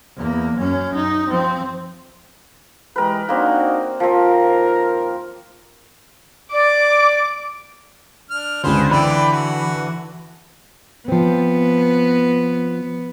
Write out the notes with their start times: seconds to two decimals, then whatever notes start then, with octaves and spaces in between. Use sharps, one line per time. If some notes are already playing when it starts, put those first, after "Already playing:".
0.16 E2 A#3
0.57 F#2 C#4
0.94 D#4
1.30 F3 C4
2.96 E3 G#3 G4 A#4 B4
3.29 A#3 C4 D4 D#4 F#4
4.00 D#2 F3 C4 A#4
6.53 D5 D6
8.30 D4 F6
8.64 C#2 D3 C4 G#4 B4 C5
8.91 E3 B4 D5 G5 B5
9.31 F#4
11.08 F3 B3 C4